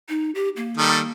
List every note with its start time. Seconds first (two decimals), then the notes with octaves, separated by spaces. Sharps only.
0.09 D#4
0.35 G4
0.57 A#3
0.77 D#3 G3 A4